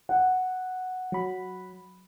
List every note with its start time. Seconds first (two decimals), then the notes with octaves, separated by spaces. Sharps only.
0.09 F#5
1.12 F#3 B5